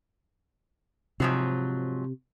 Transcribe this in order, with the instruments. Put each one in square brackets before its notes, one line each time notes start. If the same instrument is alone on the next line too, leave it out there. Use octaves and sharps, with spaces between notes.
[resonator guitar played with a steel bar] G#2 F3 F#3 [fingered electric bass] C3